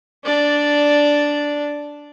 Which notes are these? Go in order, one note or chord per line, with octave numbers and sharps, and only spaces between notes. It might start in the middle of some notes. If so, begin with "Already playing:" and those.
D4 D5